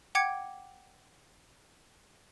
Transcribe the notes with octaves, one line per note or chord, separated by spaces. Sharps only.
F#5 G5 D6 G#6 C#7